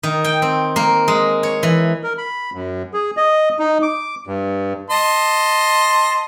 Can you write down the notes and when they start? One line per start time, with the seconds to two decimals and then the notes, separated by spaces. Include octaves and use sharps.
0.03 D#3
0.25 G5
0.42 C4
0.76 A#3
1.08 G#3
1.43 C#5
1.63 E3
2.03 A#4
2.18 B5
2.53 F#2
2.94 G#4
3.17 D#5
3.59 D#4
3.82 D6
4.27 G2
4.90 D#5 A5 C6